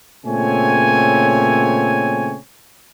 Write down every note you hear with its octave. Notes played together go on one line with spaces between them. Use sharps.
A#2 C#3 A3 C4 C#5 G#5